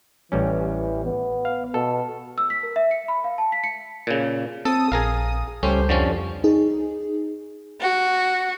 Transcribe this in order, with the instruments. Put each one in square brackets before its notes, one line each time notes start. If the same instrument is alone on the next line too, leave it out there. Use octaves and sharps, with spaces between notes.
[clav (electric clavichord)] A1 G3 C#4 [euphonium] E3
[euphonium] B3
[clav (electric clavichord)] F5
[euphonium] B2 [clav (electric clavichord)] A4
[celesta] E6
B6
A#4
E5
C#7
B5
F5
A5
B6
C#7
[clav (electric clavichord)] A#2 C#3
[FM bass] C4 [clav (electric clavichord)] A4 [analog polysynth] D#6
[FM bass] A#1 [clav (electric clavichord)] G#4 A#4 F5
[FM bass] C#2 [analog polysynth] G3 A3 C5 [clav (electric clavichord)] C#4
[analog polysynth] F2 [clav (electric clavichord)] D3 F3 C#4
[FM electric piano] D#4 G#4
[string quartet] F#4